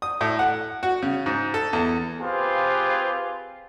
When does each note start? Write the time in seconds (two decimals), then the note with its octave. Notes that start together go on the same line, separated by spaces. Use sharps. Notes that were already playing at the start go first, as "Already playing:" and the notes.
0.02 D#6
0.21 A2
0.39 F#5
0.83 F#4
1.03 C#3
1.26 G#2
1.54 A4
1.73 E2
2.21 C4 F4 G4 G#4 B4 C5